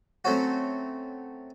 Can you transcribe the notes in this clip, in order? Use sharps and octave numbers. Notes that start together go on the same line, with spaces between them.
F#3 A3 C4 C#4 F#4